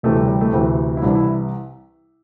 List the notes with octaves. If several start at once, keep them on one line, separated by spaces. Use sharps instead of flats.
D2 C3 E3 A3
G3
G3
A3
D2 C3 E3 C4
E4
C2 C3 E3 D4
E4